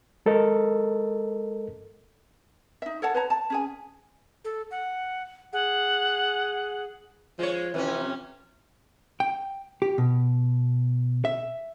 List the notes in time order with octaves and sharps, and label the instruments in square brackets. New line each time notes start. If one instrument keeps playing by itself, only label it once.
[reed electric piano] G#3 A4 A#4 D#5
[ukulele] D#4 E5
A4 C#5 F#5 A5
B4 C#5 A#5
A5
C#4 G#4 G#5
[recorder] A4
F#5
[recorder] G#4 [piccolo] F#5
[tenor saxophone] F3 [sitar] G#3 C#5
[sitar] F2 C3 C#4 [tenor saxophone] E3
[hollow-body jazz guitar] G5
G4
B2
E5